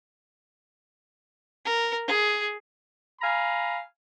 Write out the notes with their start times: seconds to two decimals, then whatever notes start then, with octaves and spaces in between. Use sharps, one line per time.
1.65 A#4
2.07 G#4
3.20 F5 G#5 A#5 B5